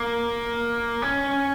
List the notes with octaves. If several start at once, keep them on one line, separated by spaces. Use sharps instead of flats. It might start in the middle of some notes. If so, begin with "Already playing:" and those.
Already playing: A#3
C#4